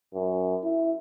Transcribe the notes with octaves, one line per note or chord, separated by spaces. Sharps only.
F#2
E4